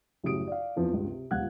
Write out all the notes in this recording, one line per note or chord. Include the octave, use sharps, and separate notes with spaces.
A1 F#2 C#3 G3 D#6 D7
D5 F5
E2 F3 C4
C#2 G2
C3
D#1 C#2 F5 F#5 F#6 G#6